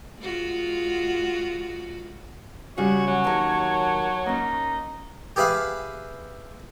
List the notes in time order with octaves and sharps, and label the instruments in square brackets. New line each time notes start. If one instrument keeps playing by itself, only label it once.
[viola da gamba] G#3 F4 F#4
[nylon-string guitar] C#3 G3 [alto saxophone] F#4 [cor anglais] C#5 [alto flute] G#5
[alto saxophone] F#3
[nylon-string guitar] D#2 A#4 [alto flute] A5
[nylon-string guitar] A#3 C#4 [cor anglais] D#4
[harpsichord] G4 G#4 B4 E5 F5